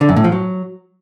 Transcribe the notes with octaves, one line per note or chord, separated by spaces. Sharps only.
D3
F#2
A2
F3
F#3